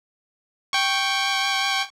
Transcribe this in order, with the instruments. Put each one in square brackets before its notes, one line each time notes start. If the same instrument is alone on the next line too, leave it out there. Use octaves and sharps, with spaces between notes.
[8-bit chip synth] G5 C#6